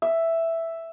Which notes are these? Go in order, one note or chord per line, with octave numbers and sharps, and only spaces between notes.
E5